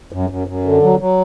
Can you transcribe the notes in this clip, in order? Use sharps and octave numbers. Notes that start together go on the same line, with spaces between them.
F#2
F#2
F#2
D3
F#3
F#3